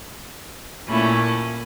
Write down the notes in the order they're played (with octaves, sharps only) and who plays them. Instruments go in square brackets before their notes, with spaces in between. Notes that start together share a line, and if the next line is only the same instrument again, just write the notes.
[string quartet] A#2 A3 C#4 E4